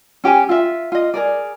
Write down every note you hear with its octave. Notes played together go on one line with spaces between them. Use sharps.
C#4 G4 G5 G#5
F4 E5
F4 D#5
G#4 A#4 D5